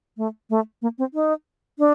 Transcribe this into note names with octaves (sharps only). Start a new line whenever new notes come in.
A3
A3
A#3
C4
D#4
D4